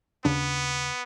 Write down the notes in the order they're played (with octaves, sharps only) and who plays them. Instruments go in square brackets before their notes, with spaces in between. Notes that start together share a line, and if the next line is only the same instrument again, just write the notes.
[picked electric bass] D#2 C#3 D4 [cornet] B3